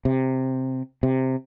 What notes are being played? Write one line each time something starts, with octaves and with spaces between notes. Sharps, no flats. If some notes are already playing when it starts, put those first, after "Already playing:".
C3
C3